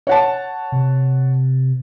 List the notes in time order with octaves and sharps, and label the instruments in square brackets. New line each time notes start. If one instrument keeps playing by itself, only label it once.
[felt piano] C#5 F#5 A5
[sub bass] C3